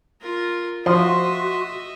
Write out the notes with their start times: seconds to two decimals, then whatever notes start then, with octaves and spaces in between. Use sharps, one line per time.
0.22 F4 A#4
0.86 F3 F#4 D#5 E5 C6